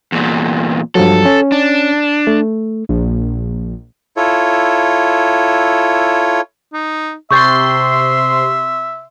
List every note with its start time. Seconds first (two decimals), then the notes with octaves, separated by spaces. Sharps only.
0.12 E2 A#2
0.95 G2 F3 F#3 A4
1.26 C#4
1.52 D4
2.27 A3
2.89 A#1
4.17 E4 F4 A4 C#5
6.73 D#4
7.31 C3 E5 C6 C#6 G6 A6